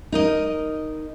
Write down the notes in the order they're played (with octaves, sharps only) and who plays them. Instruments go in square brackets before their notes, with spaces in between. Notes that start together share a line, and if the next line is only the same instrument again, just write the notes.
[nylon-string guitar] D#4 A#4 D#5